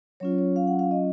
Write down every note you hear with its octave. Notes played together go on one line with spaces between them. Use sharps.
F#3 C#4 F4 C#5
C#5
F5
F#5
F5
D#5